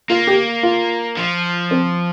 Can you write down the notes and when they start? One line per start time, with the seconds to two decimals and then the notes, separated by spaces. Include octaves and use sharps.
0.10 A#3 F4
0.27 G4
0.63 F4
1.17 F3
1.71 C4